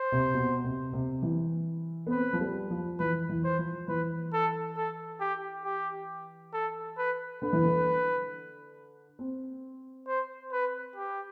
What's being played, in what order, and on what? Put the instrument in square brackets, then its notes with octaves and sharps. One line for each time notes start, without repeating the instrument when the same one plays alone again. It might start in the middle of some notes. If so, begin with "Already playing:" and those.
Already playing: [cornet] C5
[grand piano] C3
B2
C3
C3
E3
B3
[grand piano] C4 [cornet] B4
[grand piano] F3
G3
F3
[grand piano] E3 [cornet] B4
[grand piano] E3
[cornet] C5
[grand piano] F3
[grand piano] E3 [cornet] B4
[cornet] A4
A4
G4
G4
A4
B4
[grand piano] D3 [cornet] B4
[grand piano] E3
D3
C4
[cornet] C5
B4
G4